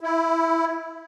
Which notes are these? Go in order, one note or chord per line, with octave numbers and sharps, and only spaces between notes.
E4